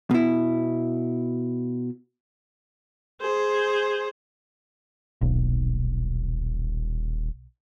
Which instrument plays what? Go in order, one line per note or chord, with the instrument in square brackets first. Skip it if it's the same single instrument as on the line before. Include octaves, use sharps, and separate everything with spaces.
[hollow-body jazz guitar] B2 E4
[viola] G#4 C5
[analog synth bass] D#1 [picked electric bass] B1